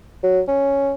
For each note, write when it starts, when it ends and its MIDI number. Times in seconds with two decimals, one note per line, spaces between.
0.24 0.40 54
0.48 0.94 61